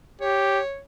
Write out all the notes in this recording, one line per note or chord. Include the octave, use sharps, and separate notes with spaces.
G4 C#5